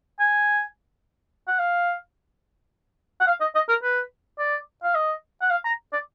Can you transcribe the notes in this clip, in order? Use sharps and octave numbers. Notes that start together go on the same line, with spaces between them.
G#5
F#5
F5
F#5
F5
D#5
D#5
A#4
B4
D5
F5
D#5
F#5
F5
A#5
D5